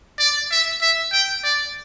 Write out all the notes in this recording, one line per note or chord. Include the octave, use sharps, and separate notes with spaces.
D5
E5
E5
G5
D5